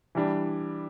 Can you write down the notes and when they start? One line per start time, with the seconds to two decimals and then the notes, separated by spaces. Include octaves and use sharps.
0.15 E3 G3 D4